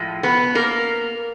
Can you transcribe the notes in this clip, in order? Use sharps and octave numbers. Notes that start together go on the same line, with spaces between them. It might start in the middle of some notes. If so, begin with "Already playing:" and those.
Already playing: A2 F3 G#3
B3 B4
A#3 A#4